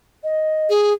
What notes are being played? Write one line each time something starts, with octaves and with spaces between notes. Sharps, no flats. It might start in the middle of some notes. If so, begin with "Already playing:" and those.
D#5
G#4